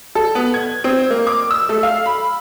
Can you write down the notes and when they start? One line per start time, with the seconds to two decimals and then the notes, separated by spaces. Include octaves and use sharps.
0.15 A4
0.35 B3
0.54 G#6
0.84 C4
1.11 A#3
1.27 D6
1.51 E6
1.69 A3
1.83 F5
2.06 B5